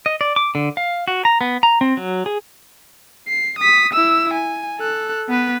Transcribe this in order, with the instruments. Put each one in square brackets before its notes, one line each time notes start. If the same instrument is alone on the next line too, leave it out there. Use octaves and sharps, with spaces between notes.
[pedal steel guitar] D#5
D5
D6
D3
F5
F#4
A#5
B3
A#5
C4
F#3
G#4
[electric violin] C7
D#6 B6
E4 E6
G#5
A4 F#6
B3 B4